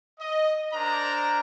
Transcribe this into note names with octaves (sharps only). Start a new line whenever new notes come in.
D#5
D4 A#4 C5 A#5